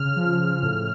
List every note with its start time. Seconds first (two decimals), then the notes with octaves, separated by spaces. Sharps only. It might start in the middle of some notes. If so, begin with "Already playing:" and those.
Already playing: C#3 F6
0.16 F3
0.62 A2